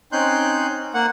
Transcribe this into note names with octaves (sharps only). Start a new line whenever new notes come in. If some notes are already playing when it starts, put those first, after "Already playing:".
C4 C#4 D#4 C6 F#6 G6
A#3 F#5